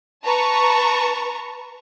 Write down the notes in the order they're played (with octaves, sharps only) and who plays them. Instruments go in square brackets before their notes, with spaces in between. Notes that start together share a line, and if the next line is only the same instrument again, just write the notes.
[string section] B4 A5 A#5 C#6